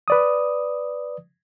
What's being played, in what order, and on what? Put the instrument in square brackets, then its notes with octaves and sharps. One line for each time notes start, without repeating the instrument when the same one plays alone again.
[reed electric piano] B4 D5 D#6